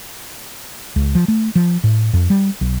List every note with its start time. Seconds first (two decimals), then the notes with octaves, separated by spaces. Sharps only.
0.96 C#2
1.15 F3
1.28 A3
1.55 F3
1.84 A2
2.13 F2
2.30 G3
2.61 B1